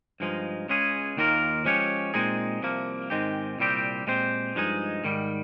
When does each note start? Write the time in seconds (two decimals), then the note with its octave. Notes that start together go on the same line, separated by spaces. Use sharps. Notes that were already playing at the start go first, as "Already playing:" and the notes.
0.20 G2 F3 G#3 D#4
0.69 C#2 C#3 G#3 C#4 G#4
1.17 D#2 D#3 A#3 F4 A#4
1.65 F3 G#3 C#4 G4 C#5
2.14 A#2 G#3 C4 D#4 G#4
2.62 C2 C3 F3 A#3
3.10 G#2 D#3 G#3 C4 G4
3.58 C2 A#2 G3 C4 G4
4.07 A#2 G#3 C4 G4 C5
4.55 G2 F3 G#3 D#4 G#4
5.04 G#2 D#3 G3